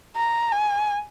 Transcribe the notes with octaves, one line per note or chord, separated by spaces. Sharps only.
A#5
G#5